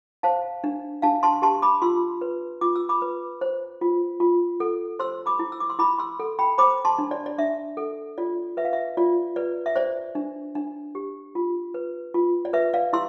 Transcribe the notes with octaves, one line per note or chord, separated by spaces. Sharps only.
C5 F5 A5
D4
D4 F5 A5
A5 C6
G4 A5 C6
B5 D6
F4 C6 E6
B4
F4 D6
E6
B5 D6
B4
C5
F4
F4
A4
C5 C6 E6
B5 D6
E4
E6
D6
C6 E6
E4 B5 D6
C6 E6
A4
G5 B5
C5 B5 D6
A5 C6
D4
D5
D5
D4 E5
A4
F4 D5
B4 E5
F5
E5
F4 D5
B4 D5
E5
C5 D5
D4
D4
G4
F4
B4
F4
D5
B4 E5
D5 F5
E4 C6 E6